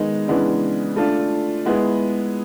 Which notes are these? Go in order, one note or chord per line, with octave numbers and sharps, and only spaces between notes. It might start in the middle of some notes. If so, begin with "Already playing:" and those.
Already playing: D#3 G#3 B3 D#4
C#3 E3 G#3 B3 D4
A3 D4 F4
G#3 B3 E4 G#4